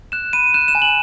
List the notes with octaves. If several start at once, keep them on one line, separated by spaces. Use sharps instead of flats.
F#6 E7
B5 D#7
F#6 E7
E7
G#5
F#7